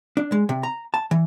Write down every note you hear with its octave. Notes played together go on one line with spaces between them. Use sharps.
D4
G#3
C3
A#5
A5
E3